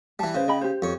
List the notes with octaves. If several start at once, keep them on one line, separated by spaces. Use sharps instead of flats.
E3 G3 A5
C#3 B4 C5
D#5 G5 B5
G4 C5
F2 C#5